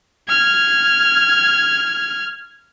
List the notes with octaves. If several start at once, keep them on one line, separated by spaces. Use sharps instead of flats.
F6 G#6